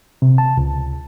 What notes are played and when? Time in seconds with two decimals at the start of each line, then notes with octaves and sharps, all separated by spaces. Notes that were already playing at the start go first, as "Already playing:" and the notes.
0.22 C3
0.38 A5
0.57 C#2